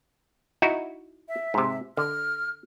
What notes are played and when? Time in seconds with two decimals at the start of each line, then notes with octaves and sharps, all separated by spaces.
0.62 D#4 E4 F#4
1.28 E5
1.54 G#2 C3
1.97 D3 F6